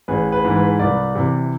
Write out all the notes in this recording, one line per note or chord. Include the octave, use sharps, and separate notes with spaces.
A1 G#4 B4
G#4 B4
G#2 E3
G#4 B4
C2 B4 D5
C3 E3